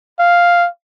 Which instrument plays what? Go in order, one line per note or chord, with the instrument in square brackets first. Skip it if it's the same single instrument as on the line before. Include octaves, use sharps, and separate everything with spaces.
[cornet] F5